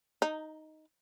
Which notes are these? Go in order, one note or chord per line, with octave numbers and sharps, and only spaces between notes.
D#4